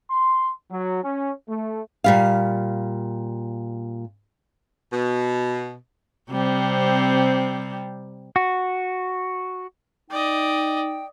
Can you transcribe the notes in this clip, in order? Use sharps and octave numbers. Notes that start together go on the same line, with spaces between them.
C6
F#3
C#4
A3
A#2 G3 F5
B2
C3 G3 C4
F#4
D#4 D5 D#5 G5